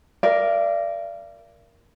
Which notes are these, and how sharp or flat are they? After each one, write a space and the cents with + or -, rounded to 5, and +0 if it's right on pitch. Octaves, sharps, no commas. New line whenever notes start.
A#4 +5 D5 +0 F5 -45